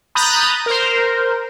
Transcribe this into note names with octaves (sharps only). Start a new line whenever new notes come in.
A#5 B5 D#6 F#6 G6 A6
A#4 C5